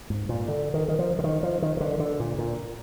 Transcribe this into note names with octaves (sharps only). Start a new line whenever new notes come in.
G#2
A#2
D3
D#3
D#3
F3
D3
D#3
F3
D#3
D#3
D3
D3
A#2
A#2